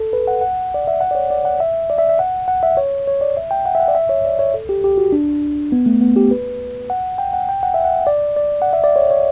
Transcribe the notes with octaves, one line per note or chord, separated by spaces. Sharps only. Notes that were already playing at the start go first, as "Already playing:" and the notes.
Already playing: A4
B4
F#5
F#5
D5
E5
F#5
D5
C#5
D5
F#5
E5
D5
E5
E5
F#5
F#5
E5
C#5
C#5
D5
E5
G5
F#5
E5
F#5
D5
E5
C#5
D5
C#5
A4
G4
G4
F#4
D4
B3
A3
B3
G4
B4
F#5
G5
F#5
G5
F#5
E5
F#5
D5
D5
F#5
E5
D5
C#5
C#5